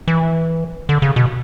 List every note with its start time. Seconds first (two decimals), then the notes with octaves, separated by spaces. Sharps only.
0.08 E3
0.89 D3
1.02 C#3
1.16 B2